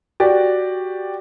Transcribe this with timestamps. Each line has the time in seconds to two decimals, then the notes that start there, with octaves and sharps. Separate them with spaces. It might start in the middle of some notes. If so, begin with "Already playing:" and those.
0.20 F#4 G4 D5